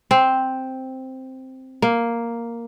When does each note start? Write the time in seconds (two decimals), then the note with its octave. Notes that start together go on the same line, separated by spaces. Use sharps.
0.11 C4
1.82 A#3